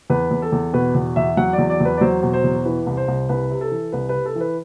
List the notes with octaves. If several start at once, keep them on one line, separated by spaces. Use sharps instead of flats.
E2 B4
E2
A4
E2
B2 B4
E2
E2 E5
F#3 F#5
D5
E2
D5
E2 B4
D5
F#3 C5
B2
C5
E2
E3 B4
C2
C5
C2
C2 B4
C3
A4
E3
C2 B4
C3 B4
A4
E3
B4